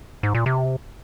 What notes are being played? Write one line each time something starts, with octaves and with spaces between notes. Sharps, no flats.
G#2
A#2
C3